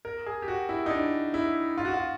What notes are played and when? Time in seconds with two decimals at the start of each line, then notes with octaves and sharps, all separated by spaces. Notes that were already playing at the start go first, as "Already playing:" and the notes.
0.05 A#4
0.27 G#4
0.42 G4
0.48 F#4
0.69 E4
0.86 D#4
0.91 D4
1.34 E4
1.78 F4
1.85 F#4
1.94 F4